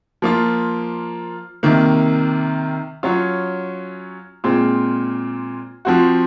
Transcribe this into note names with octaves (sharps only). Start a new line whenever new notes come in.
F3 A#3 F4
C3 D#3 A#3
F#3 C#4 F4
A#2 G#3 C4 F4
F3 C4 F#4